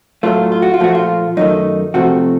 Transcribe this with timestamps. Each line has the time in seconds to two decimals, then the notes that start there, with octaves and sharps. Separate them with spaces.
0.23 A2 F#3 A3 F4
0.52 F4
0.62 F#4
0.74 F4
0.80 A#2 F3 A3 F#4
0.95 F4
1.37 F#2 D#3 A3 D#4
1.94 C3 F3 A3 F#4